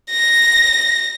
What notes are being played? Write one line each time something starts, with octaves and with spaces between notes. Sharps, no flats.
A#6